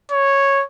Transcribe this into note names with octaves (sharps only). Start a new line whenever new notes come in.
C#5